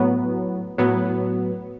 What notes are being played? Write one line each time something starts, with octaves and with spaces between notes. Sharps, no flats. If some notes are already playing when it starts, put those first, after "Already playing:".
Already playing: A2 F#3 B3
A2 F#3 B3